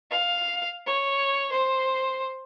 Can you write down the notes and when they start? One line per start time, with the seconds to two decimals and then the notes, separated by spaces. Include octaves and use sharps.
0.11 F5
0.87 C#5
1.52 C5